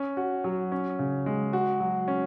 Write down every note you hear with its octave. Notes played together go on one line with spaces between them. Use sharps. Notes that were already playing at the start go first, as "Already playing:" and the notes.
Already playing: C#4
F#4
F#3
C#4
C#3
G#3
F#4
F#3
C#4